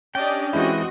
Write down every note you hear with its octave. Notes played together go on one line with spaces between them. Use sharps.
C#4 D4 G4 D5 D#5 G5
E3 G#3 C4 E4 F#4 D#5